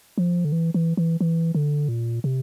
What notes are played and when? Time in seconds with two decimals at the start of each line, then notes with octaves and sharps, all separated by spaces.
0.18 F3
0.45 D3
0.52 E3
0.74 E3
0.97 E3
1.21 E3
1.55 D3
1.88 A#2
2.24 C3